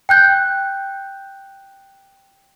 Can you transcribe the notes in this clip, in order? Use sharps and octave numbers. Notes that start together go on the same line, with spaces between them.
G5 F#6 G6